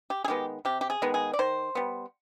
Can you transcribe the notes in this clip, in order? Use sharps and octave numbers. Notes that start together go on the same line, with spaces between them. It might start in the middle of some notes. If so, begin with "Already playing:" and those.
G4
G#4
D#3 G#3 B3 G4
C3 G4
G4
G#4
D#3 G#3 B3
G#4
D5
D#3 C5
G3 B3